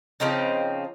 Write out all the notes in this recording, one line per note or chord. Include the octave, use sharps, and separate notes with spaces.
C#3 F3 C4 D#4